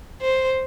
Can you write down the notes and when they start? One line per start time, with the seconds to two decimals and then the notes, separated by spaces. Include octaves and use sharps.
0.22 C5